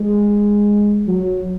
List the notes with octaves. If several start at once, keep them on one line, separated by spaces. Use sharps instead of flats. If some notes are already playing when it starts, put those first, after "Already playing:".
Already playing: G#3
F#3